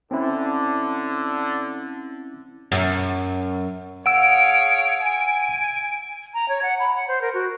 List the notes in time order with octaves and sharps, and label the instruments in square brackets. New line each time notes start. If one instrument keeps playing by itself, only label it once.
[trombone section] D3 [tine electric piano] C4 C#4 E4
[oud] F#2
[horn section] G#4 C#5 F5 [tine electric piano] F#5 E6 [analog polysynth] D7
[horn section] G#5
[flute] A#5
C#5
F#5
B5
F#5
C5
A#4
F#4